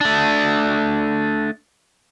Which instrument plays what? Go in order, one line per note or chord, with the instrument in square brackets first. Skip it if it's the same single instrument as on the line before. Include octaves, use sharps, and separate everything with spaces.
[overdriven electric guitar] A3 D4